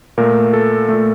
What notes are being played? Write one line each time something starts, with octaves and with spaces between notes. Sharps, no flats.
A#2 A3 A#4
A4
A#2 A3